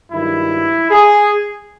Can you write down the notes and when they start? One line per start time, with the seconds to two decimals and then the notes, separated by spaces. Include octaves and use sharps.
0.12 G2 D#3 F#3 E4
0.91 G#4